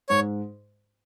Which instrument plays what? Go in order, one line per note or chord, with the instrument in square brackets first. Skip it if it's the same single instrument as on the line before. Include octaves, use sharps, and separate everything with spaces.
[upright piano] G#2 [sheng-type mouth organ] C#5